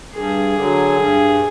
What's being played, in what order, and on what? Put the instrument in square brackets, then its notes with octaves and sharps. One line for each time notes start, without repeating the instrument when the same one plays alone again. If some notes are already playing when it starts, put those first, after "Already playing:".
[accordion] G2 [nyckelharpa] G#4
[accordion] D3 F#3
G2